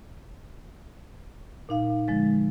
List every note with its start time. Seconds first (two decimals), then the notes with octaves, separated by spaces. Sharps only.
1.69 A#2 D#4 F5
2.08 D3 F3 G#3 A6